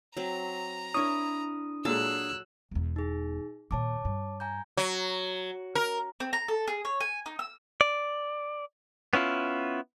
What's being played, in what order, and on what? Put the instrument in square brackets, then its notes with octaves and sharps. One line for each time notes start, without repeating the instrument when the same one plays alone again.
[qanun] F#3 C4 [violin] A#5
[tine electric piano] D4 D#6 [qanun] E4 A#4 [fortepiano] C#5
[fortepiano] A#2 G#3 [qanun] F#3 A4 A5 [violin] E6 F#6
[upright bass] E1 E2
[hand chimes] D#4 G#4
[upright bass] D#2 A#2 [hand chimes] C#5 A5 D6
[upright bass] G2
[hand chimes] G#5 A#5 G6
[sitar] F#3
A#4
[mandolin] C4
A#5
A4
G#4
C#5
G#5
D#4
E6
[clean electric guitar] D5
B3 C#4 E4 F4